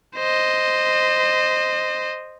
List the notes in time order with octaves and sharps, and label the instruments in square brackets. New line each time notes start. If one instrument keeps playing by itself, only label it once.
[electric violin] C5 D#5